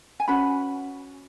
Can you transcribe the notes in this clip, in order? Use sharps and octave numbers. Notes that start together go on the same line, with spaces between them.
G#5
C#4 F#4 B4 B5